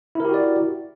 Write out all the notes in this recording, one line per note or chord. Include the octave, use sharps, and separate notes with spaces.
E4 F#4 G4 A#4 D5